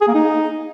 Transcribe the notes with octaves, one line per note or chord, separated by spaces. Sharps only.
G#4
A#3
D#4